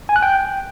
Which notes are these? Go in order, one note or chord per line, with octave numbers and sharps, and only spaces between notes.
G#5
F#6
G5